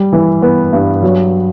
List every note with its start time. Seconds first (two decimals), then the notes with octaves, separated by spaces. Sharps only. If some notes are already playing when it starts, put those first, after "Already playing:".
Already playing: G3
0.13 E3
0.42 B3
0.73 G2
1.03 F#3